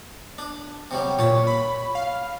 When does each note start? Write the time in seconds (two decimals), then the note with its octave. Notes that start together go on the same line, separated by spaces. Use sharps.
0.38 D4
0.91 C3 F#3 G3
1.19 A#2 C#5 A5
1.47 B5
1.95 F5